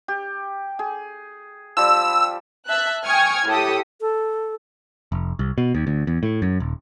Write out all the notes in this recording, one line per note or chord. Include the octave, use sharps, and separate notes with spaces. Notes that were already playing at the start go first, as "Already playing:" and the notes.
G4
G#4
F3 G3 E6
E5 A5 F#6
G5 G#5 C#6 D#6 F6 G#6
A2 G4 A4 D#6
A4
F1
C2
B2
D#2
D2
E2
A2
F#2
D#1